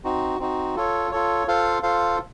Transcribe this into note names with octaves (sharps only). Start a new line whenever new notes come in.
C4 D#4 F#4
C4 D#4 F#4
F4 A4 C#5
F4 A4 C#5
F4 A4 C5 F5
F4 A4 C5 F5